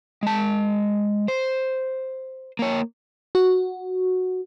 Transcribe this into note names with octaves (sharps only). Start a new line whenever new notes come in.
G#3 A5
C5
A#3 C#5
F#4